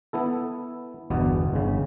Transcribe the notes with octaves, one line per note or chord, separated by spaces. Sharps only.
B3 E4 A4
G1 E2 B2 B3
G1 C#3